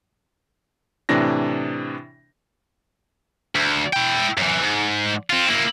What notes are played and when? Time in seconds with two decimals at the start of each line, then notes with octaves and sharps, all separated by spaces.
1.09 A2 C3 E3 D4 A#6
3.55 D2
3.93 E4 G5
4.37 F#2 E3
4.61 G#2
5.30 C4 F4
5.48 A#3 E4